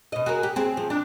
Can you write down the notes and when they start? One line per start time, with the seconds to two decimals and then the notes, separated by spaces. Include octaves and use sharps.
0.12 B2 D#5
0.26 F#4 G#4 A#4
0.43 G4
0.56 C4 G#4
0.77 F3
0.90 D4